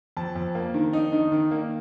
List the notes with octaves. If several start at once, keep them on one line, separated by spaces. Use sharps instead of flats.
F2 A5
F2
A#3
D#3
D#4
D#3
D#3
A#3